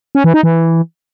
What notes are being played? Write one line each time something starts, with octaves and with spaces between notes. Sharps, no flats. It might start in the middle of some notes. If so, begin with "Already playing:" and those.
C#4
E3
D#4
E3